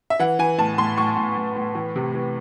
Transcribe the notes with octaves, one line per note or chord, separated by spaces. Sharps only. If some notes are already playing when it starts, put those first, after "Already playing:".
E5
E3 F#5
E3 G#5
A2 A5
A2 C6
A2 C#6
A2
A2
A2
E3
C3
E3